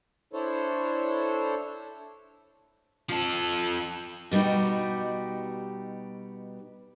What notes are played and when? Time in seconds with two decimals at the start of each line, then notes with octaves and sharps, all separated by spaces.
0.33 D4 E4 A4 C5 C#5
3.10 F3 A4
4.31 B2 G3 D#4 F#4 G4